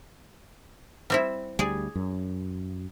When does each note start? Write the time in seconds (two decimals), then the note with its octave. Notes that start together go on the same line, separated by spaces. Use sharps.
1.10 G3 C4 E4
1.59 D2 G3 G#4 D5
1.95 F#2